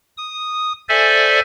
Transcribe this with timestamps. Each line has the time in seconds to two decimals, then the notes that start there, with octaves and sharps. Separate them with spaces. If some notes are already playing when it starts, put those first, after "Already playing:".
0.17 D#6
0.89 A4 C5 D5 E5 G#5